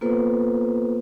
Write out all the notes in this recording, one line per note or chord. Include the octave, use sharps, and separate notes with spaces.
A#3 B3 F4 A4 B4 C5